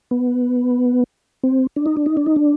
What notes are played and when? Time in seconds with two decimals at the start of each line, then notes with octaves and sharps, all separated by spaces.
0.11 B3
1.43 C4
1.76 D4
1.86 D#4
1.97 D4
2.06 D#4
2.17 D4
2.26 D#4
2.36 D4